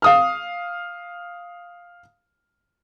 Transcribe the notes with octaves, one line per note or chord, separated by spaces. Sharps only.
F5 D#6 F6